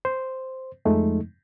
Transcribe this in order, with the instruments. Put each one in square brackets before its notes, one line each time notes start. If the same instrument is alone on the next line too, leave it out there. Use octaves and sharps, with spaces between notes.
[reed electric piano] C5
F2 F3 G#3 A3 D#4